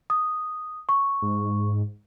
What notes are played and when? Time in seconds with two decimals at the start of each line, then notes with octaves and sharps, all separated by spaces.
0.10 D#6
0.89 C#6
1.22 G#2